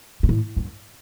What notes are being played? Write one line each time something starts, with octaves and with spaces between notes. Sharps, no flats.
B2
A2
F#2